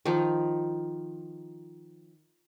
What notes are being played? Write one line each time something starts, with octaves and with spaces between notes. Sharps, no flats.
D#3 F3